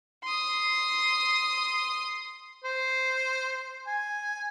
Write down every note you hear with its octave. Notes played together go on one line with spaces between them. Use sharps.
C6 D#6
C5
G#5